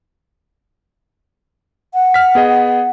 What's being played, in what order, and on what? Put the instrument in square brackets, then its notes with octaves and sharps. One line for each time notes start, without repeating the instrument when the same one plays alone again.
[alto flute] F#5
[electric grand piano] F6 B6
B3 G#4 D#5